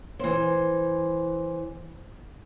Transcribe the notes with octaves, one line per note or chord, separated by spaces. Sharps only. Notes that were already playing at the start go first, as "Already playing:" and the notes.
E3 C5